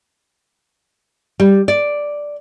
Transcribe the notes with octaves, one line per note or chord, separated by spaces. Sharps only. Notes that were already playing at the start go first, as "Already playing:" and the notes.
G3
D5